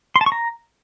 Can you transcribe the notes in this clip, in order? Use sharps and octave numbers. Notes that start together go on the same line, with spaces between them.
C6
A5
C#6
A#5